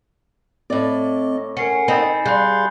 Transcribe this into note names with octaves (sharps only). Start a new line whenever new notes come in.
A2 C4 D5 D#5
C#4 A#4 F#5 G#5 C7 C#7
C4 D#4 B5 A6
G3 G#4 F5 B5 C6 F#6 G6